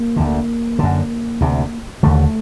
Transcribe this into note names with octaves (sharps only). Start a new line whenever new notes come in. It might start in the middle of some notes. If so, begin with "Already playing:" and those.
Already playing: A#3
D2 D3
F#2 D3
D2 C3
D#2 D3 A3